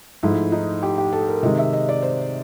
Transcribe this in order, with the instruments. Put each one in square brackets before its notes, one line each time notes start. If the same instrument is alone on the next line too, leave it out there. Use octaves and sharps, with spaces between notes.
[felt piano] G#2 F3 A3 E4
D#4
G4
G4
A4
A#4
C3 D#3 G#3 D#5
E5
D#5
D5
C5